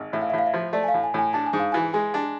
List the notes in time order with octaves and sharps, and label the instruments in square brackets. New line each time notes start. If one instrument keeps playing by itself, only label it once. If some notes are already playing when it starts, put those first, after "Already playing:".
Already playing: [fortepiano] G#1
[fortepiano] A2 [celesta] E5
[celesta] F5
E5
[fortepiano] A2
[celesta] F5
E5
[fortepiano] F3
[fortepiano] A3 [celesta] D5
[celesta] G#5
F5
[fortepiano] A2
[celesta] G#5
[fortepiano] A2 [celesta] G#5
[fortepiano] D4 [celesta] A5
[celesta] G#5
[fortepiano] G#2
[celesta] F5
[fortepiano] E3 [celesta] G#5
[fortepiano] G#3 [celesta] G#5
[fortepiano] D4